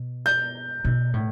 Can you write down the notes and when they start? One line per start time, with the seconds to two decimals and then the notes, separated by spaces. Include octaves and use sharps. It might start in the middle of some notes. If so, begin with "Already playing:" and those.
Already playing: B2
0.26 G6
0.84 B2
1.14 A2